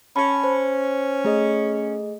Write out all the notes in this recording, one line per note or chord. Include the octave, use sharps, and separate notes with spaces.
C#4 A5 B5
C5
A3 G#4 D#5